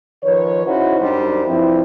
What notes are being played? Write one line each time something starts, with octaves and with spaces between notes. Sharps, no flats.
D#3 F3 B4 C#5
C#3 C#4 D#4 E4 F#4 C5
F#2 G3 D4 D#4 C5
G2 F3 C4 E4